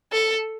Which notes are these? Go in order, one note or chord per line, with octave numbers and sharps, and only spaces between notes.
A4